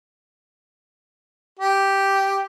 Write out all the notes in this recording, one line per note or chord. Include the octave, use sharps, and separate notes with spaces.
G4